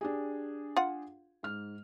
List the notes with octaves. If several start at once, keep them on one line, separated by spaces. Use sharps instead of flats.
D4 G4 G#4
F4 F#5
G#2 F6